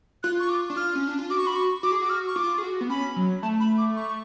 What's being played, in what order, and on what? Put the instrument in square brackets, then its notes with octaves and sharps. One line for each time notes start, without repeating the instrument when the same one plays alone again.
[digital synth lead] F4 [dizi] F#6
[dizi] C#6
D6
[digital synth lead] D4
[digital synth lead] F4 [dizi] F6
[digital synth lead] C#4
D4
F4
[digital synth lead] F#4 [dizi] D6
[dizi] C#6
B5
C#6
[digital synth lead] F#4 [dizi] D6
[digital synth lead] G#4
[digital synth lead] F#4 [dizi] D6
[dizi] F6
C#6
[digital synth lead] F4 [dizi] D6
[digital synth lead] G#4
F#4
B3
[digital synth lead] C#4 [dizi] B5
[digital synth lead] F#3
[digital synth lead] A3 [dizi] A5
[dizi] B5
D6
C#6